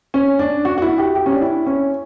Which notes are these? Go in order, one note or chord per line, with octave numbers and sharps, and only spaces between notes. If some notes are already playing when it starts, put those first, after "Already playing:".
C#4
D4
F#4
F#4
E4
G4
G4
C#4
D4
E4
C#4